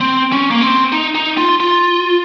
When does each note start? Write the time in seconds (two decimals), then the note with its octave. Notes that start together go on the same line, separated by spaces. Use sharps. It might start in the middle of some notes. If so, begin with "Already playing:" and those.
0.01 C4
0.32 C#4
0.51 A#3
0.61 C4
0.92 D#4
1.15 D#4
1.38 F4
1.60 F4